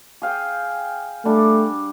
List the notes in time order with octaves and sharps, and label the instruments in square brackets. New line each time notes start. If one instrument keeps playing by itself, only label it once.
[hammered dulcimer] G#4 F5 G5
[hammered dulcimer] G3 D4 [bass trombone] A3